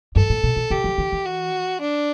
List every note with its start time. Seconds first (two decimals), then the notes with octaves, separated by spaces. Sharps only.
0.16 G2 A4
0.30 A2
0.43 B2
0.56 B2
0.70 C#3 G4
0.84 F#3
0.98 D3
1.12 E3
1.26 F#4
1.81 D4